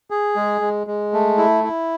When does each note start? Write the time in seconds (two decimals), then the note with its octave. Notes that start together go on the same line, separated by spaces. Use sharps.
0.11 G#4
0.36 G#3
0.61 G#3
0.87 G#3
1.13 A3
1.38 E4
1.64 E4